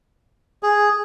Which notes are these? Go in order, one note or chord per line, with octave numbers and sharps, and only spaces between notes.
G#4